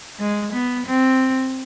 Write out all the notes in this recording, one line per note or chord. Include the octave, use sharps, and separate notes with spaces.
G#3
B3
C4